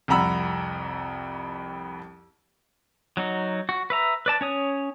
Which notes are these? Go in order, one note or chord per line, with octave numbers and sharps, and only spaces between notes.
C2 F2 F#5 A#5 B5 E6
F#3 D#4 F#4
F#4
B4 E5 A#5
B4 D5 A5
C#4 C#5 D#6